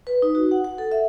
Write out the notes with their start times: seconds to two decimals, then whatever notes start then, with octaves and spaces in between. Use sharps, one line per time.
0.07 B4
0.22 D#4
0.35 F#4
0.51 F#5
0.64 F#5
0.78 A4
0.92 E5